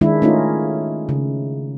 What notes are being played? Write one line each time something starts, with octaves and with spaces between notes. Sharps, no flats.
D#3 G#3 D4 E4
A3 C#4 D#4 F4
C#3